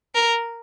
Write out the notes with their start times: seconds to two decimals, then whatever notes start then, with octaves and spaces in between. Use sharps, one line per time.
0.15 A#4